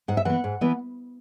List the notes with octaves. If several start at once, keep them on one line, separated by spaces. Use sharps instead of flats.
G#2 F#5
E5
E3 B3 F#5
G#2
E3 B3